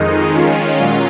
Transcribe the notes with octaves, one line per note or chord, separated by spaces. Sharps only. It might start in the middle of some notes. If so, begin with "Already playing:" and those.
Already playing: F2 D#3 G#3 D#4
D#3 G#3 C#4 F4
A#2 F#3 C#4 F4